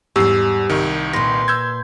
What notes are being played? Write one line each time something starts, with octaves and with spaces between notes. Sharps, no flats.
E2 G#2 G3 G4 E6 C7
C2 D#3
A#2 B4 C6 A#6
E6 G6 G#6